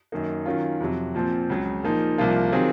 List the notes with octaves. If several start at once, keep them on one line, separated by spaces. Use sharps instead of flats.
F#2 D#3 A#3 D#4
D#3 F#3 C#4 F4
F2 C3 F#3
A#2 F3 C4
C#2 C#3 F#3
A#2 F3 A#3 D#4
C2 C3 F3 A#3 F4
D#3 F#3 C4 F4 G#4